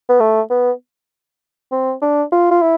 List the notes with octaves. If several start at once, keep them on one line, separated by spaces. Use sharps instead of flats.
B3
A3
B3
C4
D4
F4
F4
E4